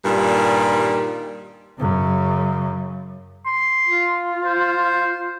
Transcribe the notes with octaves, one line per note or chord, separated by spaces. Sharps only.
G2 A#2 D#3 G3
F#2 C#3
C6
F4
C5